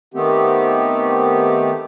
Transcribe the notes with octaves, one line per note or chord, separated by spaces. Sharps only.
D#3 A3 B3 C4 G4